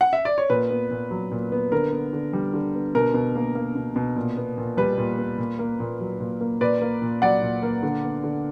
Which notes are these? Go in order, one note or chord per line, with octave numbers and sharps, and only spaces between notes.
F#5
E5
D5
C#5
A#2 B4
B3
A#2
F#3
A#2
B3
D3 A#4
B3
D3
G3
D3
B3
B2 A#4
B2
A#3
A#3
B2
B2
A#2
B3
A#2
G3 B4
A#2
B3
A#2
A#3
A#2
F#3
A#2
A#3
A#2 B4 D5
A#3
A#2
F#3 D5 F#5
A#2
A#3
D3
B3
D3